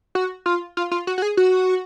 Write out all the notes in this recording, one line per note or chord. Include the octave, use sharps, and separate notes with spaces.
F#4
F4
F4
F4
F#4
F#4
G#4
F#4